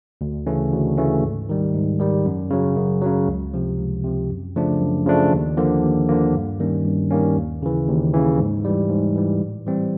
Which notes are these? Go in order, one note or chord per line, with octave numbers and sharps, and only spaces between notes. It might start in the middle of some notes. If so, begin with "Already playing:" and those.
D2
C#3 E3 A3 C#4
D2
C#3 E3 A3 C#4
G#2
D#3 G3
G#2
D#3 G3
F#2
C#3 F#3
F#2
C#3 F#3
C#2
C3 F3
C#2
C3 F3
F#2
C#3 F3 A3 D4
F#2
C#3 F3 A3 D4
D#2
D3 F3 A#3
D#2
D3 F3 A#3
G2
D#3 G3 A#3 C#4
G2
D#3 G3 A#3 C#4
D#2
C#3 E3
D#2
C#3 E3
G#2
E3 G3
G#2
E3 G3
A2
E3 G3 C4